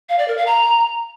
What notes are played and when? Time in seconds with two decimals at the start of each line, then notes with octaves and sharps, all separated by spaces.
0.09 F5
0.19 D5
0.28 A#4
0.37 F5
0.47 A#5